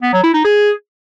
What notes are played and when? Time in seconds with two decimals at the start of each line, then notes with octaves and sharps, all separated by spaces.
0.03 B3
0.13 F#3
0.24 E4
0.34 D#4
0.45 G#4